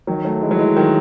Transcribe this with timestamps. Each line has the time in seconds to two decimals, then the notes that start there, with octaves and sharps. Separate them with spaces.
0.07 D#3 F#3
0.25 F#3 A3
0.41 E3 G#3
0.51 F#3
0.59 E3 G#3
0.76 D#3 F#3